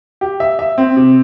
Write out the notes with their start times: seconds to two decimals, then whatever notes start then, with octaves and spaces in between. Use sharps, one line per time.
0.21 G4
0.40 E5
0.59 E5
0.78 C4
0.97 C3